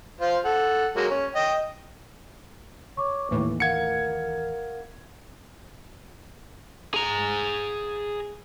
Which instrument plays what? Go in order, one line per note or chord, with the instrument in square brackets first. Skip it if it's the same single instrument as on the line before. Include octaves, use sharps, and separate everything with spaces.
[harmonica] F4 C5 F5
A4 F#5
F#3 G#3 A#3
C#4
D#5 G5
[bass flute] C#5 [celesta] C#6 D6
[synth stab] D#2 A2 E3 [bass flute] A#3
[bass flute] A#4 [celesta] F5 F#5 [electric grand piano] G#6 C#7
[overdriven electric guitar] G#4 A#5